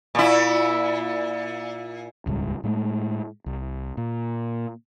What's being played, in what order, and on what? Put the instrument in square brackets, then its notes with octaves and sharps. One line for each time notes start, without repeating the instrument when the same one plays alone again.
[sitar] A#2 E4
[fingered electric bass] D#1 C#2 G#2 G3
A2 G#3 A3
C2
A#2